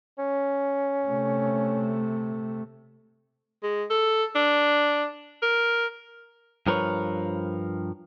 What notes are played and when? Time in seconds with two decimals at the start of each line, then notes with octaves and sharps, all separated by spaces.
0.18 C#4
1.06 C3 A3
3.63 G#3
3.90 A4
4.35 D4
5.42 A#4
6.67 G2 F3 A#4 B4 C#5